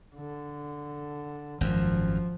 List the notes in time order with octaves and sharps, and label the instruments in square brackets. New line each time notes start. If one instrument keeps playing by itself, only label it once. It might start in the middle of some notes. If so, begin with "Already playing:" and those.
[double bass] D3
[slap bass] G#1 F#2 [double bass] F3